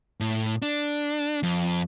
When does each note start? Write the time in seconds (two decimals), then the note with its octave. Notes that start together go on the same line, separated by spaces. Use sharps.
0.20 A2
0.62 D4
1.43 F2